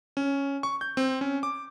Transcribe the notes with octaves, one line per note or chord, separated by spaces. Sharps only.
C#4
C#6
G6
C4
C#4
D6